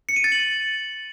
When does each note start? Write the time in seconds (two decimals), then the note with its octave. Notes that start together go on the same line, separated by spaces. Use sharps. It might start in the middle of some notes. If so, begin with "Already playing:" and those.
0.09 C#7
0.16 D#7
0.24 A6
0.32 F#7